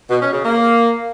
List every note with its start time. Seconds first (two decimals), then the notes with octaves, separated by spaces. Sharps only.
0.10 B2
0.21 C#4
0.33 C#3
0.45 A#3